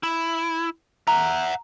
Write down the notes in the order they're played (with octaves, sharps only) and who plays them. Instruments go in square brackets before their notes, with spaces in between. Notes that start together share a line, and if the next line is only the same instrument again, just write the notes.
[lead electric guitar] E4
[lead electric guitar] E5 F#5 [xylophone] A#5